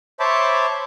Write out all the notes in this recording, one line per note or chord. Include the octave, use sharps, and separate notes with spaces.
C5 C#5 E5 A5 B5 D6